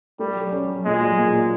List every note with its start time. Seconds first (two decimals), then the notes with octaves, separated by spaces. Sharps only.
0.19 G3 A3
0.36 F#3
0.52 C#4
0.68 F#3
0.85 A#2 G#3
1.01 F#3
1.18 A#2
1.34 A#2